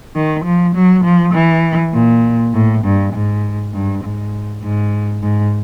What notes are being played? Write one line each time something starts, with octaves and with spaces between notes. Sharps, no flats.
D#3
F3
F#3
F3
E3
A#2
A2
G2
G#2
G2
G#2
G#2
G#2